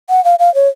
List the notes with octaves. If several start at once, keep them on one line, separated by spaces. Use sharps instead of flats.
F#5
F5
F5
C#5